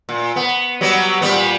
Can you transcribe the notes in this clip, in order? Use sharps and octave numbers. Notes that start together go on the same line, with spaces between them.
A#2
B3
F#3 G3 B3
A#2 G3 B3